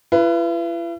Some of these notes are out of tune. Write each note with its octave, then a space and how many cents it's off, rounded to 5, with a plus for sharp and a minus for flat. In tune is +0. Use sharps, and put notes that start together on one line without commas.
E4 +45 B4 +0